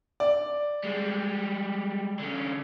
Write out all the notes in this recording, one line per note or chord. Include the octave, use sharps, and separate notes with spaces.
D5
G3 G#3
D3 C#4